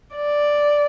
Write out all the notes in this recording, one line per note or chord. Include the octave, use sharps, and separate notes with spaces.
D5